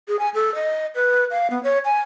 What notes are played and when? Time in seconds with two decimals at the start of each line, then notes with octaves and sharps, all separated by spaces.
0.08 G#4
0.19 G#5
0.35 A4
0.55 D#5
0.95 B4
1.31 F5
1.50 B3
1.64 C#5
1.85 G#5